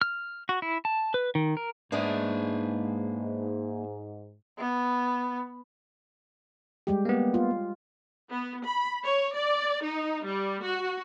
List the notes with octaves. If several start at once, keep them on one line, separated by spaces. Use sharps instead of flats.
F6
F#4
E4
A5
B4
D#3
A#4
G#2 G#3 A#3 B3 D4 E5
B3
G3 G#3 G4
A#3 B3
F4
B3
B5
C#5
D5
D#4
G3
F#4